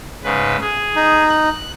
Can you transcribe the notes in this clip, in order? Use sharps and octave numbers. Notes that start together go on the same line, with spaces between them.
G#2 C#3 B4
G#4
D#4
F#6